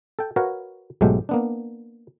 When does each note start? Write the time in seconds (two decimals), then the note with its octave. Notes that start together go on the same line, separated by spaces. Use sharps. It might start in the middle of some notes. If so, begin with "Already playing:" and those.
0.19 A4 G5
0.36 F#4 A#4 B4 C#5 F5 F#5
1.01 B1 G#2 F#3 G#3 A3 G4
1.29 A#3 B3 D4